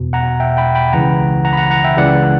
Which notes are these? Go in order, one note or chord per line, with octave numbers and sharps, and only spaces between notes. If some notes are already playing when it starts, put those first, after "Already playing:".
Already playing: E2 B2
F#5 A#5
E5 G5
G5 B5
G5 B5
C#2 C#3 E3 F#5 A#5
F#5 A#5
B5
F#5 A#5
F#5 A#5
E5 G5
C#2 C#3 E3 D5 F#5